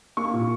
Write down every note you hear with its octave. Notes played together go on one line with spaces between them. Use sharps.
A#3 C#6
A#2